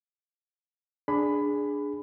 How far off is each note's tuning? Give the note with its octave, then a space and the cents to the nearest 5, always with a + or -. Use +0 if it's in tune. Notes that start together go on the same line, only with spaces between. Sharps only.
D4 +0 G#4 +0 B5 +15